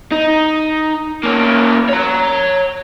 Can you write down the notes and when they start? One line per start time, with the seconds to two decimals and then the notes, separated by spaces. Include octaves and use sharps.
0.12 D#4
1.23 A#3 C#4
1.89 C#5 A#5